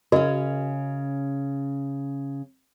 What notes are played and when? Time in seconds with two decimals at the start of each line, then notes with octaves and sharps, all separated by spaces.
0.12 C#3 C#4 F#4 A#4 D#5